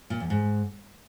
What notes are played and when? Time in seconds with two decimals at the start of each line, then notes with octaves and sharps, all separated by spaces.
0.10 A#2
0.20 E2
0.30 G#2